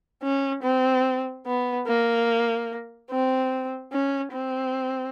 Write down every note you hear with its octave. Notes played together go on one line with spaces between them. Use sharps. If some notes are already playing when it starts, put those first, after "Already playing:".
C#4
C4
B3
A#3
C4
C#4
C4